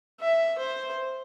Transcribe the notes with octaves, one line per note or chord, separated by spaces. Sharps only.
E5
C5